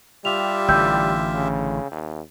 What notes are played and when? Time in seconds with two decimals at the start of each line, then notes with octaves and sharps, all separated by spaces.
0.25 G3 F4 G4 E5 F7
0.68 A1 D3 E3 G5 E6 G6
1.34 C#3
1.91 D#2